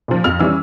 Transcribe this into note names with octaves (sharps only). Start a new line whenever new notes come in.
A#2 F3
F2 F6
E3 G3 C#4 E6